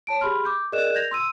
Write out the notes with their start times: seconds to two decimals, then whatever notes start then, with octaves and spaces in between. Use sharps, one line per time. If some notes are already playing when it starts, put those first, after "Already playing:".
0.07 C#5 A5 D7
0.21 G4 G#4 B5 C6 F6
0.45 D6 G6
0.72 G#4 A#4 D5 D#5 F#6 E7
0.95 G6 G#6 A#6 F7
1.11 C6 E6 D#7